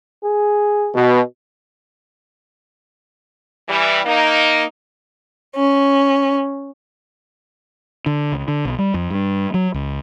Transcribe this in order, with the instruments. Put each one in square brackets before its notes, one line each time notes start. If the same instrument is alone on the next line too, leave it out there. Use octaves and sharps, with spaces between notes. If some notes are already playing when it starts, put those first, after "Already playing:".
[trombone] G#4
[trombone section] B2
[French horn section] E3 G3
A#3 D#4
[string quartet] C#4
[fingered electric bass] D3
C#2
D3
B1
G3
F2
G2
F#3
C#2